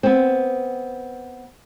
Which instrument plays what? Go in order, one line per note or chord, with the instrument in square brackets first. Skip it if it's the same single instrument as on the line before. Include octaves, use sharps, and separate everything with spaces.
[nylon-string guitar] B3 C4